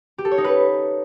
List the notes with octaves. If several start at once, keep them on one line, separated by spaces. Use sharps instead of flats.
G4
A4
C#5
D#4
B4